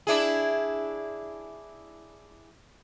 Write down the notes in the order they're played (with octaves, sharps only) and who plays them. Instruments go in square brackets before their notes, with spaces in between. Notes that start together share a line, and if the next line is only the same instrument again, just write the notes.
[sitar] D4 E4 G#4